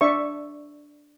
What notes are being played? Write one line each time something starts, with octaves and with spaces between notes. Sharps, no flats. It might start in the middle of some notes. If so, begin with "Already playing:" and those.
D4 D5 E5 C#6